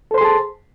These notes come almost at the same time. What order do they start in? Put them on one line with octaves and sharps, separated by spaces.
A4 C5 C6 G#4 A5